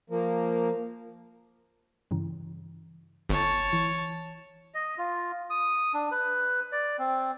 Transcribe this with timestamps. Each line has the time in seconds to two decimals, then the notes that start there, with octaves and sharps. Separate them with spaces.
0.10 F3 A#3
2.11 G2 C#3 E3
3.29 G1 C#5 A5
3.73 E3
4.74 D#5
4.98 F4
5.50 D#6
5.94 D4
6.11 B4
6.72 D5
6.99 C4